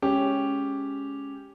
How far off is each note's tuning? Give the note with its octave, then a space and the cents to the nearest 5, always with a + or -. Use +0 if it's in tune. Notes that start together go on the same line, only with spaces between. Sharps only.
G#3 +0 C#4 +0 G4 +0